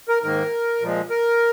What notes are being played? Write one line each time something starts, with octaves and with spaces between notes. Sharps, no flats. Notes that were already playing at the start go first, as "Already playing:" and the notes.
A#4
G#2 D#3 A#3 A#4
A#2 F3 G#3
A#4